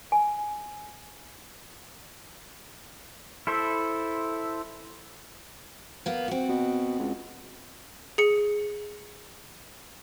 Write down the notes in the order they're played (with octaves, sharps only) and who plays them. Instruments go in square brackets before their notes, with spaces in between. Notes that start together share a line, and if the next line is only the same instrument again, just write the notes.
[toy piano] G#5
[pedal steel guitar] E4 A4 C5 E5
[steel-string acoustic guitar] A#3 B3
C4 F#4
[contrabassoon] B2
C#2
[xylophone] G#4 C#7